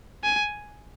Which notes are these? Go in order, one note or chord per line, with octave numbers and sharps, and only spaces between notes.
G#5